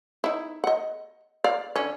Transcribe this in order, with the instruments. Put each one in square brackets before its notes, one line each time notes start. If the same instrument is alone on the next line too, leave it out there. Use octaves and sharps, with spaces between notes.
[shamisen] D#4 E4
D#5 F#5
D5 F5
D3 C#4